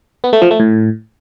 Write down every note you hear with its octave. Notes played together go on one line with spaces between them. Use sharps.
B3
A3
F3
A3
A2